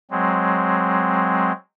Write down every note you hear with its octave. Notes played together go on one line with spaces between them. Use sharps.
F#3 G#3 C4